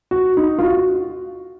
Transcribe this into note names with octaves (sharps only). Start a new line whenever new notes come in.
F#4
D#4
F4
F#4